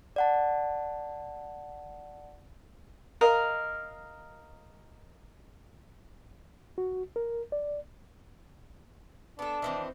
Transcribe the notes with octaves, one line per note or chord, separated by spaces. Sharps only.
D5 F#5 A5
A#4 D#5 F5
F#4
A#4
D5
B3 D4 A4
D#3 E3 C4